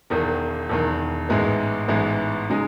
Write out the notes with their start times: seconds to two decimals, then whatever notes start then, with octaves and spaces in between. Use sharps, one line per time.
0.10 E1 E2 D#3
0.69 E1 E2 D#3
1.29 A1 G#2 E3 G#3 B3
1.88 A1 G#2 E3 G#3 B3
2.50 C#3 G#3 D#4